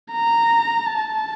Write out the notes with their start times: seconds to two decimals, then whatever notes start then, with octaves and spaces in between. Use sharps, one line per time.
0.12 A#5
0.87 A5